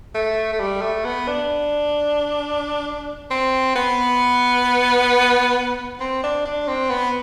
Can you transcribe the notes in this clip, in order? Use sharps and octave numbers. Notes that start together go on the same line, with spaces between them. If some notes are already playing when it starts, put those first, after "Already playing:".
A3
A3
G3
A3
B3
D4
C4
B3
C4
D4
D4
C4
B3